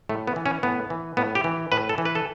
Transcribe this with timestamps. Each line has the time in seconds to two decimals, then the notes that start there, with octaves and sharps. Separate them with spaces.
0.09 A2 A3
0.27 B3
0.36 E3
0.46 C#4
0.63 A2 B3
0.90 E3
1.17 A2 B3
1.35 G4
1.44 E3
1.72 A2 B4
1.89 A4
1.98 E3
2.05 B4
2.15 A4